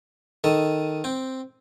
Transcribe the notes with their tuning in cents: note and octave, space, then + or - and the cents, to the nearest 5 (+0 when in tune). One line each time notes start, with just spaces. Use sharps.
D#3 +0 A4 +0 D#5 +0
C4 +0 G5 +0